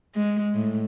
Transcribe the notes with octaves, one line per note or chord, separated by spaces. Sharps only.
G#3
A2